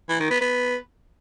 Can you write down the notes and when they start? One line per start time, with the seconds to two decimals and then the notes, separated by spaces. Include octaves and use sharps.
0.09 E3
0.20 D#3
0.30 B3
0.41 B3